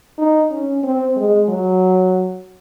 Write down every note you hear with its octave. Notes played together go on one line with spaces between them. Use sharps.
D#4
C#4
C4
G#3
F#3